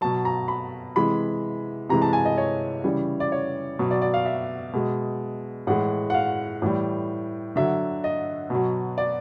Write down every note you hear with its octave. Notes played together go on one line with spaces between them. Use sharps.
B2 F#3 A5
A#5
B5
C3 E3 G#3 B5
C3 E3 G#3 A#5
A5
G#5
D#5
C#5
C#3 E3 G3
D5
C#5
B2 F#3
D5
D5
F5
E5
B2 G#3
A2 E3 G#3 F#5
F#5
F5
A2 E3 G3
D3 F#3 E5
D#5
B2 F#3
D5